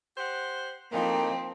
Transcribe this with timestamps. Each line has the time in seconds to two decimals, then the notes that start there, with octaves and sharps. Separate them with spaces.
0.18 G4 C5 F#5
0.92 A2 F3 G#3 A#3 C4 D#4 G5